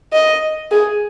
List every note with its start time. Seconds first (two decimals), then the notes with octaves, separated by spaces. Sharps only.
0.13 D#5
0.71 G#4